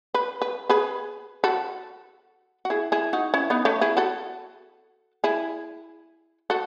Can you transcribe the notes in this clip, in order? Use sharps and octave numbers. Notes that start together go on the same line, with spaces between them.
B4
B4
G#4 B4
F#4 A4
F#4
E4 G#4
E4 G#4
D#4 F#4
C#4 E4
B3 D#4
A3 C#4
E4 G#4
F#4 A4
E4 G#4
F#4 A4